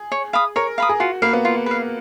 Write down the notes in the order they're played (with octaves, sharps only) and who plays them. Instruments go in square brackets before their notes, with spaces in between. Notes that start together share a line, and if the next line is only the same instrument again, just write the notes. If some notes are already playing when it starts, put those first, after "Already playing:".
Already playing: [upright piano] G#4
[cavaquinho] C#5
F5 B5 D#6
[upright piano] A#4 [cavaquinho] C#5
[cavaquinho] F5 B5 D#6
[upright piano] G#4
[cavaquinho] F4 [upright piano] F#4
[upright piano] A#3 [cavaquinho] B4 F5
[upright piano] B3
[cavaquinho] F4
B4 F5